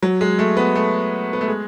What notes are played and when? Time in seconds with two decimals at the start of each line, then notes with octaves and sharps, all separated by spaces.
0.03 F#3
0.21 G#3
0.39 A3
0.57 B3
0.75 A3
1.33 B3
1.41 A3
1.48 G#3